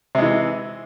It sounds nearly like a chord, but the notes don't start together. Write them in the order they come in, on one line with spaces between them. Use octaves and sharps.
C3 G#3 E3